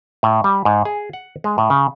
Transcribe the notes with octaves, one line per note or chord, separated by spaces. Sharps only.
A2
G3
G#2
G#4
F#5
G#3
A2
C#3